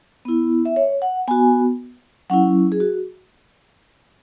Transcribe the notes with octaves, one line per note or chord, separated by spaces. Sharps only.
B3 E4
E5
C#5
F#5
B3 F#4 G#5
F#3 C#4 E4 F#5
G#4
F#4